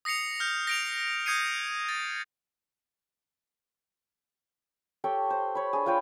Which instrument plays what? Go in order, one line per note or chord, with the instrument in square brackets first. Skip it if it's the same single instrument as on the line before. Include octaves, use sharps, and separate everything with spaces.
[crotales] D#6 A#6 C7 C#7 F7
F6 G6
A#6 D7 F7
D#6 G6 G#6 C7 C#7 D#7
A6
[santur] G4 A4 C#5 G5
C5
C#5 B5
D4 G#4
F4 B4 C#5 G5